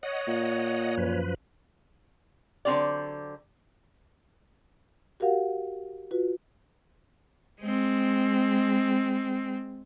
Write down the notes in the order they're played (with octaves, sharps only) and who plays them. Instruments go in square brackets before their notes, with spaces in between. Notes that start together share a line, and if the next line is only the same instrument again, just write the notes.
[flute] C#5 [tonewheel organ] D#5 F#5
[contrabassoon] A#2
[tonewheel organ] F#2 F3 B4
[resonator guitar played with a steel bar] D3 F#3 G#3 C4 G4 D5
[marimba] F#4 G4 A#4 F5 F#5
F4 F#4 B4
[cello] G#3 C4